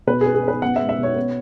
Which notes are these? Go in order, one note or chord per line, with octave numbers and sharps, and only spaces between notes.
B2 B4
G#4
B3
G#4
B3 B4
B2 F#5
E5
G#3
E5
B2 C#5
B3